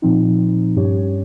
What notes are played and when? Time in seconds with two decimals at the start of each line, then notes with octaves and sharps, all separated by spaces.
0.02 A#2 F3 C4 D#4
0.76 G2 G3 C#4 G4 C#5